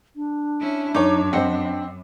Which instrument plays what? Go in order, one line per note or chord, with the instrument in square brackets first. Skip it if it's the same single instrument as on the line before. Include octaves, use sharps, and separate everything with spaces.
[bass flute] D4
[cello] C#4 E4
[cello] F#2 [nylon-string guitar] D#4 [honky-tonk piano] C#5 D6
[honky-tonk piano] C4 [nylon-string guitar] C5 D#5 F#5